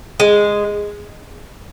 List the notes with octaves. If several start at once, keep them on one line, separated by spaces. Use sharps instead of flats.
G#3